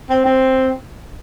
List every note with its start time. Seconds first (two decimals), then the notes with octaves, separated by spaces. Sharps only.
0.09 C4
0.25 C4